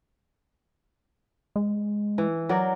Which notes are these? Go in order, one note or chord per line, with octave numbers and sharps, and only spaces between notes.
G#3
E3
F#3 A#4 D5